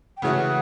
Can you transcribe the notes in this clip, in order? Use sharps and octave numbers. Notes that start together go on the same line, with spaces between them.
G5
C#3 E3 A3 C#4 F#4 F#5